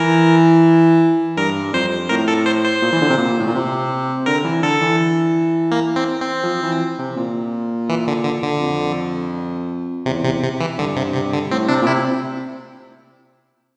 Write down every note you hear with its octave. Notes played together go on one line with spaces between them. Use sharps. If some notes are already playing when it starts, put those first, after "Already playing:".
Already playing: E3 A#4
G2 A#4
F2 C5
A2 A#4
A4
C5
C5
A#2
E3
D3
C3
A#2
A2
A#2
C3
D3 A#4
E3
D3 A4
E3
A#3
C4
C4
F3
E3
C3
A#2
E3
D3
D3
D3
F2
E2 C3
C3
C3
E3
G2 D3
C3
C3
D3
A2 C4
C3 D4
A#2
C3 E4